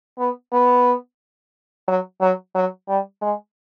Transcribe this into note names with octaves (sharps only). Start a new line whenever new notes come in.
B3
B3
F#3
F#3
F#3
G3
G#3